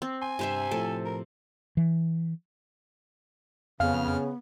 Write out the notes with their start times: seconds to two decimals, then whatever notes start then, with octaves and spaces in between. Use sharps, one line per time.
0.02 C4
0.22 G#5 C6
0.39 G2 C3 C5 E5
0.71 A2 F3 A4
1.05 A#4
1.77 E3
3.80 F2 C#3 B3 F5 F6